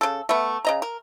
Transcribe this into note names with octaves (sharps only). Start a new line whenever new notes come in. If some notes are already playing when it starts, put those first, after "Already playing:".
C#3 A4
A3 B3
C#3 D#5 A#5
A#4